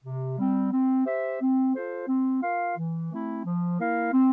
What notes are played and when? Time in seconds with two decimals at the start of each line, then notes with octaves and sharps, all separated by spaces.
0.04 C3
0.38 G3 C4
0.72 C4
1.05 G4 C5 E5
1.41 C4
1.75 F4 A4 C5
2.08 C4
2.42 F4 A#4 F5
2.77 E3
3.11 A3 C4 E4
3.44 F3
3.78 A#3 E4 A#4 F5
4.13 C4